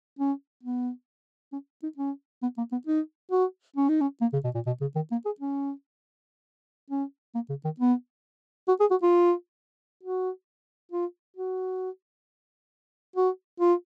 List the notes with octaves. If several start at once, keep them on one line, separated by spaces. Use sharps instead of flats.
C#4
B3
C#4
D#4
C#4
B3
A#3
B3
D#4
F#4
C#4
D#4
C#4
A#3
C#3
B2
A#2
B2
C#3
D#3
A#3
G#4
C#4
C#4
A#3
C#3
D#3
B3
F#4
G#4
F#4
F4
F#4
F4
F#4
F#4
F4